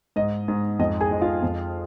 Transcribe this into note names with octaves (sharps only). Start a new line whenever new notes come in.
G#2 D#5
G#2
F2 D#5
G#4 G#5
G#3
F4 F5
F2